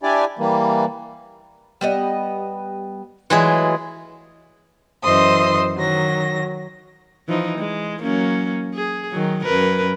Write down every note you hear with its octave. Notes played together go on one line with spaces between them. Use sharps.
D4 E4 G4 D5 G#5
E3 G3 A#3
G3 B3 D#5
E3 F#3 G#3 A3 F4 G#4
F#2 E3 C5 D#5 C6 D#6
D#3 F#3 A#6
E3 F3 D#4
G#3
F#3 A#3 C#4
G#4
D#3 F#3
F#2 A#4 B4